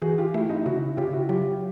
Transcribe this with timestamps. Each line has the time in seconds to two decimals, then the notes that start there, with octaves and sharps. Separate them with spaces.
0.02 E3 F#4 G#4
0.18 F4 G4
0.34 A3 E4 F#4
0.49 D#4 F4
0.66 C#3 E4 F#4
0.97 C#3 F4 G4
1.13 E4 F#4
1.29 F#3 F4 G4